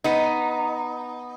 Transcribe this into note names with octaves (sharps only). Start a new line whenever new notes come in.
B3 D#4